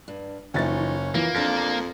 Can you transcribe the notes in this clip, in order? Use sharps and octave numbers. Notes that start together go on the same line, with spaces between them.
G2
F#1 E3 F3 C#4 D#4 A6
E3 F3 A#3
F2 D4 F5 A#6 C7